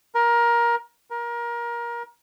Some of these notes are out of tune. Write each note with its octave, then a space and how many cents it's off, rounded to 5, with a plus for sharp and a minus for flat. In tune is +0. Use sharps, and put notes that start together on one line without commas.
A#4 +20
A#4 +25